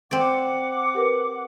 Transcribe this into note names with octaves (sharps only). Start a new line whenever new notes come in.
C4 D5 F#5 D6
G4 A#4 B4